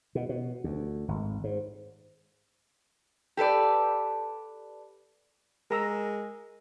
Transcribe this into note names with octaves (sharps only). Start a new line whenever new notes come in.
B2
B2
D2
G#1
G#2
G4 A4 B4 D5
G#3 A#4 A#5 E6